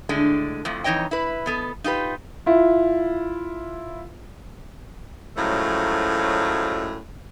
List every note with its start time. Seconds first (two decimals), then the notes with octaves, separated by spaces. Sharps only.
0.09 A2 D3 G#3 D4
0.65 F2 A2 F3
0.84 F2 E3 D#4 C#5 D#5 G5
1.11 E4 B4
1.46 B2 B3 A4
1.84 D#4 F4 G4 B4
2.46 E4 F4
5.37 F#2 A2 F3 F#3 G#3 A3